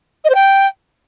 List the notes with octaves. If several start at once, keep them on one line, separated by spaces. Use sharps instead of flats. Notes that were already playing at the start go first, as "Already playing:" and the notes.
D#5
C5
G5